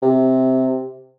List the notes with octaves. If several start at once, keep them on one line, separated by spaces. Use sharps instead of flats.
C3